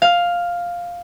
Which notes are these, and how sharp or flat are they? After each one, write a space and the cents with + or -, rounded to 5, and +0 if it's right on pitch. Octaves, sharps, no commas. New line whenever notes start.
F5 +5